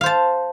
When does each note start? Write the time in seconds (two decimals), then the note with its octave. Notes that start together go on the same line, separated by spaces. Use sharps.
0.01 F5
0.03 C5
0.06 A5